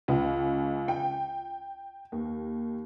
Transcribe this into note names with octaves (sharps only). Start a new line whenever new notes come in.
C#2
G5
D#2